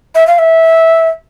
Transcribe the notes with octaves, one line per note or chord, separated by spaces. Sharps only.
E5
F5
E5